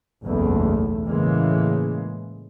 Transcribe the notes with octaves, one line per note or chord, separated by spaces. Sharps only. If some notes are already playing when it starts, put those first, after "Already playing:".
F#1 B1 E2 A3
A2 C#3 E3 G#3 A#3